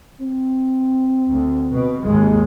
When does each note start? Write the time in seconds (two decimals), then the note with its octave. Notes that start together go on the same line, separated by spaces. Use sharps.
0.21 C4
1.29 D2
1.72 B2
2.04 G#1 D#2 G#3